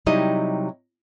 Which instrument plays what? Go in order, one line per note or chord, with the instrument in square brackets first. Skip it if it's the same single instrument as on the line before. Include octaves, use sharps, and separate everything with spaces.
[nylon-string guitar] C3 F#3 G3 D#4 E4 D#5